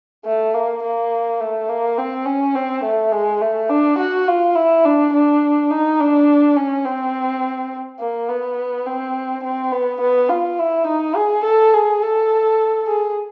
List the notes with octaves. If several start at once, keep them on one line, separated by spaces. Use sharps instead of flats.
A3
A#3
A#3
A3
A#3
C4
C#4
C4
A3
G#3
A3
D4
F#4
F4
E4
D4
D4
D#4
D4
C#4
C4
A#3
B3
C4
C4
B3
B3
F4
E4
D#4
G#4
A4
G#4
A4
G#4